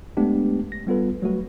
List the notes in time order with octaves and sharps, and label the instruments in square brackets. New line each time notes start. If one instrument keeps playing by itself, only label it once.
[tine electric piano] G#3 A3 B3 D4 G4
A#6
G3 B3 F4 A4 B4
F#3 G3 A3 F#4 B4